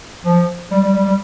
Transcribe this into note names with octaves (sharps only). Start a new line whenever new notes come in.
F3
G3
G3
G3
G3